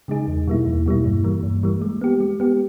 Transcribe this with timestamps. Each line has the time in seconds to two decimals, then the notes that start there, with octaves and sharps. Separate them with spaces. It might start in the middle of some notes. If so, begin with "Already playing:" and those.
0.08 C#3 G#3 D#4 G#4
0.28 E2
0.47 B2 G3 A#3 E4
0.66 E2
0.86 B2 G3 A#3 E4
1.05 G2
1.24 E3 G3 A#3
1.43 G2
1.63 E3 G3 A#3
1.82 G#3
2.01 B3 G4
2.21 G#3
2.40 B3 G4